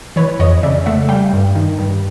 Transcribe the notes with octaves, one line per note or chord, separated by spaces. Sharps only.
E3 B4 C#5
F2 C#5 D#5
C#3 D5 E5
A3 E5 F#5
G3 F5 G5
G2
D#3
G2